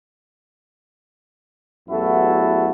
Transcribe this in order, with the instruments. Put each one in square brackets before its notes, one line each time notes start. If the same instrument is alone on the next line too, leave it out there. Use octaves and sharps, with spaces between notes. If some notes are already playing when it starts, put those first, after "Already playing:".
[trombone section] A1 E2 F#3 E4 F#4 A4